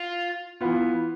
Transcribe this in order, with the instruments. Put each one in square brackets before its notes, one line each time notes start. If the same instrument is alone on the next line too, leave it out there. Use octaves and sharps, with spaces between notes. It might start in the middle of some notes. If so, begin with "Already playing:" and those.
Already playing: [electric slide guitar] F4
[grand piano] E3 B3 F4